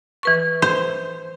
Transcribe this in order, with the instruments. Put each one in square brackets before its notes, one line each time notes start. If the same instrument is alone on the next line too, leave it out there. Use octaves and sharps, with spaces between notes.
[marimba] E3 B4 C#6
[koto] C5